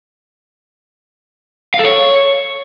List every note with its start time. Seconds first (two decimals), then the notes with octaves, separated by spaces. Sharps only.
1.74 F5
1.79 A4
1.84 C#5